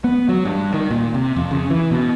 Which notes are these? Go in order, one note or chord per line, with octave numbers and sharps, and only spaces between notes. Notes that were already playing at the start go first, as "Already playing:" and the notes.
B3
F#3
G2
D#3
A#2
C3
F2
C#3
E3
B2